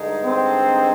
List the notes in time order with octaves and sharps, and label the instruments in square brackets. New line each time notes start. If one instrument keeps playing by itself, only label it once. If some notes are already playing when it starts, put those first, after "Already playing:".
Already playing: [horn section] G2 D3 G#3 D#4
[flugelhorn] C4